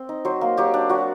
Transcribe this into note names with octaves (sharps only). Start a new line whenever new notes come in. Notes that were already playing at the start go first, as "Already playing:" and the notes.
Already playing: C4
D#4
F#3 C5
A#3 A#4
F#3 G4
D4
F#3 F#4